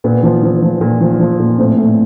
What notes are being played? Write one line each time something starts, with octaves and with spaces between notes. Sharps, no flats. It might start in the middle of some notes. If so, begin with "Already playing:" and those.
A#2 B3
F3
F3
F3
A#2
F3
F3
A#2
A2 C4
A2